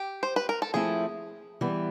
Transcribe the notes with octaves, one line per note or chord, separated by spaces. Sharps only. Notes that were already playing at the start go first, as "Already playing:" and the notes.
Already playing: G4
C5
B4
A#4
A4
F3 A3 C4 E4 G#4
E3 G3 B3